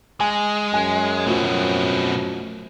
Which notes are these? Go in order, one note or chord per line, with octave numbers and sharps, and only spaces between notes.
G#3 G#5
F#2 G#5
B2 F3 F#3 A3 C4